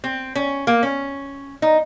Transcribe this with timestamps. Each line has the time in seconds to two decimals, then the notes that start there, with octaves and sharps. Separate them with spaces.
0.04 C4
0.35 C#4
0.67 A#3
0.83 C#4
1.62 D#4